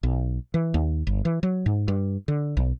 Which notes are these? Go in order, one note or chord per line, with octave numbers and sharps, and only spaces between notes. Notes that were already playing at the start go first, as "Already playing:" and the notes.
B1
E3
D#2
G1
E3
F#3
G#2
G2
D3
B1